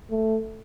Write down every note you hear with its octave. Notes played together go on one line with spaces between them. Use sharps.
A3